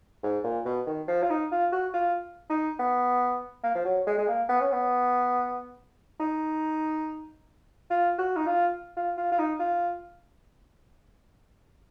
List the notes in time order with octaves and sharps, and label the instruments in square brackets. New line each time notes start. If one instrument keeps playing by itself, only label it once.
[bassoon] G#2
A#2
B2
D#3
F3
F4
D#4
F4
F#4
F4
D#4
B3
A#3
F3
F#3
G#3
G#3
A#3
B3
C#4
B3
D#4
F4
F#4
D#4
F4
F4
F4
F4
D#4
F4